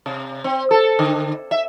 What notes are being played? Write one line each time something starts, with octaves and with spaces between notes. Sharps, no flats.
C3
C4
A4
D3
E5